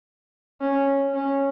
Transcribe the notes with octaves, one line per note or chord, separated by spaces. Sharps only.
C#4
C#4